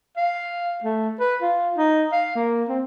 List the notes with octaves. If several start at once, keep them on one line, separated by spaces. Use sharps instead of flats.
F5
A3
B4
F4
D#4
F5
A#3
C4